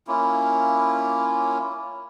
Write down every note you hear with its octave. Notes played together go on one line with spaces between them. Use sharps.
A#3 C#4 E4 F4